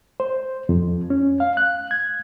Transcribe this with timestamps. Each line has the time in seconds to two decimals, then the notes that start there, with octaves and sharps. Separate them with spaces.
0.20 C5
0.69 F2
1.10 C#4
1.40 F5
1.57 F#6
1.91 G#6